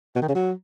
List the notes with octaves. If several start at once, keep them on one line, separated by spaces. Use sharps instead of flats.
B2
D#3
C#3
F#3